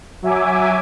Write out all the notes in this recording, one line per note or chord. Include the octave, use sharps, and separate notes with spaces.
F#3 E5 G#5 D6